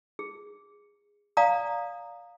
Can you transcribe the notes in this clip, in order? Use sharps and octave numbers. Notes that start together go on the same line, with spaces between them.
G#4
D5 F5 G#5 A#5 D#6